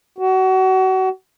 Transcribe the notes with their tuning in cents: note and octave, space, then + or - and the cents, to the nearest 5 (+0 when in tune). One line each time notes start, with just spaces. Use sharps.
F#4 +30